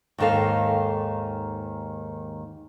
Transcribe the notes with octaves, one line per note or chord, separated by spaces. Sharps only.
D#2 G#2 D#3 A4 F5